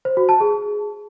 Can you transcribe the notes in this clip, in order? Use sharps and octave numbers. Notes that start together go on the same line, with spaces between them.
C5
F#4
A5
G#4